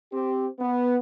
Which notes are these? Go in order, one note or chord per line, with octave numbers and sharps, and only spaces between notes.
C4 G4
B3